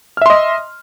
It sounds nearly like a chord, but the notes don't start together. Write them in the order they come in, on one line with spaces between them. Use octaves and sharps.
F6 E5 C6 D#5